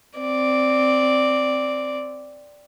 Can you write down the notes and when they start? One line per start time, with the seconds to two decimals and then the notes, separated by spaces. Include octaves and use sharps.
0.19 C4 D5